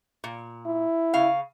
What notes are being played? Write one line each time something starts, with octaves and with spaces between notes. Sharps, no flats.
A#2
E4
C#3 F5